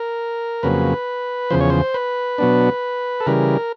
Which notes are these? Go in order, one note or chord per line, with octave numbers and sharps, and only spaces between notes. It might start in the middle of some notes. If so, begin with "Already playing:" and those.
Already playing: A#4
F2 C#3 F#3 A#3 B4
E2 C#3 F3 C5
C#5
C5
B4
B2 F#3 B3 D4
A4
C#3 E3 G3 A#4